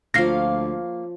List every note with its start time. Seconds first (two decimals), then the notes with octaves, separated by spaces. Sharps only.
0.14 D2 F3 A#3 C#5 F5 A#6 C7